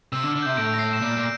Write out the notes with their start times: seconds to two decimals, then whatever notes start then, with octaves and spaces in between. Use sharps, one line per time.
0.12 C3 E6
0.23 D3
0.28 F6
0.35 D3
0.42 C3 G6
0.57 A2 D7
0.74 A#6
0.79 C7
0.93 E7
1.01 A#2 D7
1.16 A#2 D7